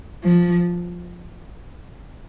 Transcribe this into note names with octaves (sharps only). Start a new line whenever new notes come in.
F3